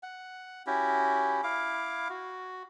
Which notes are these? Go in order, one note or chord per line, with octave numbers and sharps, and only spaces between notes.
F#5
C#4 E4 F#4 G4
E4 F5 D6
F#4